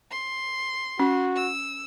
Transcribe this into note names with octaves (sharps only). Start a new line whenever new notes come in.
C6
C#4 F#4
E6